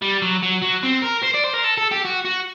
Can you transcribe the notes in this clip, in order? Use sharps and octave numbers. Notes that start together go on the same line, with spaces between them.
G3
F#3
F#3
F#3
C4
A#4
C5
D5
C5
A#4
A4
A4
G4
F#4
F#4